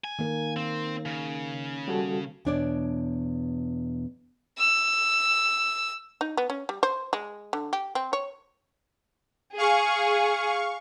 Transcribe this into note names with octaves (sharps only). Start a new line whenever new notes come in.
G#5
D#3 A#3 A#4
D#3 C4
C#3
G3 F#4 A4
E2 B2 D4 C#5 D5
E6
D#4
B3
C#4
G3
C5
G#3
D3
G4
C4
C#5
G#4 F5 C#6